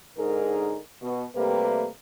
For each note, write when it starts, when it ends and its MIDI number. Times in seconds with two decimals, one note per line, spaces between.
0.17 0.77 44
0.17 0.77 50
0.17 0.77 63
0.17 0.77 68
0.17 0.77 70
1.01 1.23 47
1.35 1.86 48
1.35 1.86 55
1.35 1.86 57
1.35 1.86 58
1.35 1.86 71